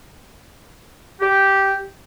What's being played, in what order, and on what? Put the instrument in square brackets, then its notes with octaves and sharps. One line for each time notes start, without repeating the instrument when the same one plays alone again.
[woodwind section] G4